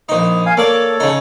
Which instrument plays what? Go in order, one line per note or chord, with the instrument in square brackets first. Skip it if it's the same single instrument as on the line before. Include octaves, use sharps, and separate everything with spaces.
[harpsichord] A#1 D#4 [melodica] D#6
[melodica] F5 G#5
[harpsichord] A#3 D5 [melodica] A4 C#5
[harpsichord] C#3 D#4